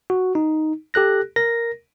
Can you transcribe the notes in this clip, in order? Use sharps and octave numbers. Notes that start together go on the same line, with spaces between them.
F#4
D#4
G4 A4 F#6 A#6
A#4 A#6